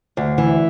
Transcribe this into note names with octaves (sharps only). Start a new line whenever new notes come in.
D2
E3